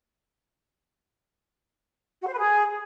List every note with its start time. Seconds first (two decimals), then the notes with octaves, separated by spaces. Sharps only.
2.22 F#4
2.27 C5
2.33 B4
2.39 G#4